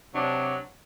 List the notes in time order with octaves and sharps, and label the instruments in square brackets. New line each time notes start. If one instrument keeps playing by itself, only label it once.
[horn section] C3 D4 [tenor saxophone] F#3